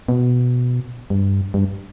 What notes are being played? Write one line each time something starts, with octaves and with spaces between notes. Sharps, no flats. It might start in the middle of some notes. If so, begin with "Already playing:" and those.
B2
G2
G2